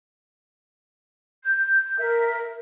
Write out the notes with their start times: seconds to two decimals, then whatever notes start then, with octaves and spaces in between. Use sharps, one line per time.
1.43 G6
1.99 A#4 E5